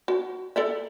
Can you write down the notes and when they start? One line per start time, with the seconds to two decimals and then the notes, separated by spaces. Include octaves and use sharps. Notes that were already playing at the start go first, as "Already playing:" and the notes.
0.08 F#4
0.56 A4 D5 E5